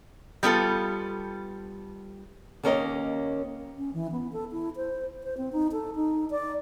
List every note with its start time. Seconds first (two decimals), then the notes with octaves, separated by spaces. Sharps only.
0.43 G3 B3 F4 A4
2.63 D#2 A#3 C#4 A#4 D#5
3.78 C#4
3.94 E3
4.12 B3
4.33 A4
4.52 E4
4.76 C5
5.23 C5
5.38 C4
5.52 D#4
5.72 A4
5.96 D#4
6.31 D5